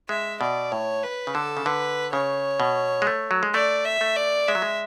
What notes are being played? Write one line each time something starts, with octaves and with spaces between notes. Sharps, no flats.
G#3 E5
B2 D5
A2 C#5
B4
C#3
D3 A4
C#3
D3 B4
C#3 C#5
B2
G#3
A3
F#3
G#3
A3 D5
E5
A3
D5
G#3 E5
F#3
G#3